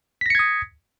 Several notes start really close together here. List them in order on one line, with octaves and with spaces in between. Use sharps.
B6 A#6 C#7 G#6 D#6